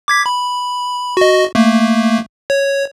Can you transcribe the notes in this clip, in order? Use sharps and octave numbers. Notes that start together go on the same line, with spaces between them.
D6 G#6 B6
B5
F#4 D#5
A3 A#3
C#5